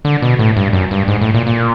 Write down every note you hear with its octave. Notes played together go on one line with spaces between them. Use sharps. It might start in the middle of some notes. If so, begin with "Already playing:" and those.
D3
B2
A2
G2
F#2
G2
G#2
A2
A#2
A#2